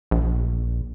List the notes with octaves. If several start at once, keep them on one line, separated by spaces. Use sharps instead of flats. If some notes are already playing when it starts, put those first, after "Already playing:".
A#1